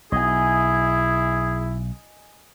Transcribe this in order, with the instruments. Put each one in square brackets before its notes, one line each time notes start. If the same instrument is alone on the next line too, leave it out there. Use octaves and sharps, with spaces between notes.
[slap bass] B1 [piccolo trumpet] E4 [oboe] G#4 [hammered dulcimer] D#5 G#5